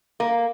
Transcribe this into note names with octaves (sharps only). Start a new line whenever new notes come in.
A#3